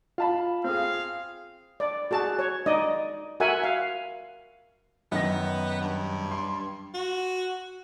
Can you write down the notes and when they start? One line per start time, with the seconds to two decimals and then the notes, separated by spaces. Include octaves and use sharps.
0.18 F4 F5 A5 B5
0.64 C4 G#4 F5
1.80 D5
2.11 F#4 G#4 A5
2.39 C#5
2.66 D#4 D5 D#5
3.40 F#4 A#4 E5 F#5 G#5
3.64 F5
5.12 F#2 D#3 B3 A#6
5.81 G2
6.31 C6
6.94 F#4